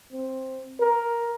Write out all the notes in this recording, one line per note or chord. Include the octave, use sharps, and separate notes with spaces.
C4
A#4